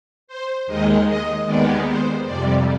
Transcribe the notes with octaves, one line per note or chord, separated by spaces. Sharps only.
C5
D#2 D#3 G#3 D#5
D#5
D#2 D#3 G#3 B3 D5
C5
F2 C3 G3 D5